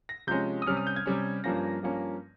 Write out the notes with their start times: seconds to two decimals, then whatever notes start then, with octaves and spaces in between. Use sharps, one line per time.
0.09 A#6
0.27 C3 F3 G#3 C#4 G6
0.62 D#6
0.66 C3 G3 C#4 F6
0.77 D#6
0.87 G6
0.96 G#6
1.06 C3 G3 C#4
1.44 G2 F3 A#3 C#4 A#6
1.83 G2 F3 A#3 C#4